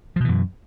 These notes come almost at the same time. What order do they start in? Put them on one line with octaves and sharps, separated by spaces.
F3 B2 E3 F#2